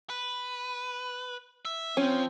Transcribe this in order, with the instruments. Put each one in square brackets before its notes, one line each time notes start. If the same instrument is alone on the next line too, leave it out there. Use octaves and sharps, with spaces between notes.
[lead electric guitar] B4
E5
[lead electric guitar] F3 [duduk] C4 [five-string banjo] C#4